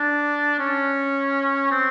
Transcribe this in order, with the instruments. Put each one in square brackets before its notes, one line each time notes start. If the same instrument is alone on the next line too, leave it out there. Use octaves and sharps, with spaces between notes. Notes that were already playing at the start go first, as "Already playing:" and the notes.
Already playing: [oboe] D4
C#4
C4